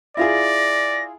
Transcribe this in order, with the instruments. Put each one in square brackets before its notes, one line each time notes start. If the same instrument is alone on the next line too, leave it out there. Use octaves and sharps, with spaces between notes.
[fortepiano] E4 F4 G#4 [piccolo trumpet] D5 [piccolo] A#6